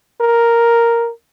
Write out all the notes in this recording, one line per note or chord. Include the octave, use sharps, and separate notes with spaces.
A#4